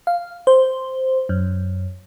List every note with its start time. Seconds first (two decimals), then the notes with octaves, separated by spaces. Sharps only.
0.07 F5
0.47 C5
1.29 F#2